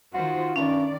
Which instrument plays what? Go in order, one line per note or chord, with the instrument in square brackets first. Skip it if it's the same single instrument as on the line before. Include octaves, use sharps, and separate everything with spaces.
[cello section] D#3 F4 C5 [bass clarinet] F#4
[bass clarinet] G2 [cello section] D#3 D5 [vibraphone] C#4